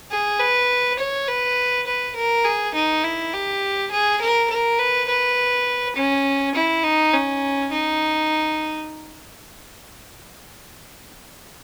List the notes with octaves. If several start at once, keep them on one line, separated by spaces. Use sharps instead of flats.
G#4
B4
C#5
B4
B4
A#4
G#4
D#4
E4
G4
G#4
A#4
A#4
B4
B4
C#4
E4
D#4
C#4
D#4